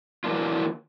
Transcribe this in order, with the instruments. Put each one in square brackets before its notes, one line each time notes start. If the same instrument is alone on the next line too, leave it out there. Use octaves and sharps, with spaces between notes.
[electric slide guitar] E3 F#3 A#3 D4 F4